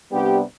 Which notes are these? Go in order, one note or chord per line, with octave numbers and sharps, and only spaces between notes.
C3 G3 B3 D4 G4